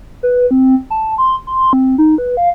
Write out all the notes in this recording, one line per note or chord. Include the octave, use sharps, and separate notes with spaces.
B4
C4
A5
C6
C6
C4
D#4
B4
F5